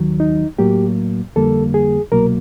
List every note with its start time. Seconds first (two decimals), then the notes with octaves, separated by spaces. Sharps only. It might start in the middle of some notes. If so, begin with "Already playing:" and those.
Already playing: D#2 D#3 F#3
0.20 D#4
0.59 A2 F#3 A#3 G4
1.36 F2 D3 G3 A#3 A4
1.74 G#4
2.12 C2 B2 F#3 A#3 A#4